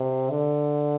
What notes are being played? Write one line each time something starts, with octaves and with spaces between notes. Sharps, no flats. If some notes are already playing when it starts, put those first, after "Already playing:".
Already playing: C3
D3